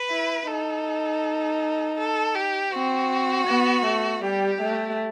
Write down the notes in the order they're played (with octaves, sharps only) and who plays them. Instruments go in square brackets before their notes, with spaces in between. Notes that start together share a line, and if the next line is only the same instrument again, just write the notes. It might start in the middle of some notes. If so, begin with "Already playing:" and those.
Already playing: [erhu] B4
[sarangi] E4
[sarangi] D#4 [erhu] A4
[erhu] A4
G4
[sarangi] C4 [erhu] F#4
[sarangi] B3
A3
[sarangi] G3 [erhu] G4
[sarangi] A3